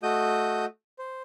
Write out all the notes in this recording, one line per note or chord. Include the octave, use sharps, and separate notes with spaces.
A3 F#4 D#5 D#6 G6
C5